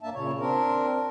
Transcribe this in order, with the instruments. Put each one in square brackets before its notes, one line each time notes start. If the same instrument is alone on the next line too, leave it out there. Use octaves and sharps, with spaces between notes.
[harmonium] G2 A#3 D4 E5 A5
A#2 C#3 C#5
C4 D4 A#4